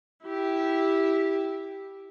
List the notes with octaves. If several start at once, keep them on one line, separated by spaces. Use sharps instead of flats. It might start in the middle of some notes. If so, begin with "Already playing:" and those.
E4 G4